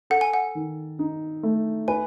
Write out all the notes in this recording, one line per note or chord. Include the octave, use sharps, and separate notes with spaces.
A4 F#5
G#5
F#5
D#3
D#4
A3
B4 G#5